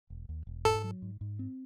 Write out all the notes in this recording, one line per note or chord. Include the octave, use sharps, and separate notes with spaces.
E1
D#2
E1
G#2 A4
F#3
G#2
G#2
C4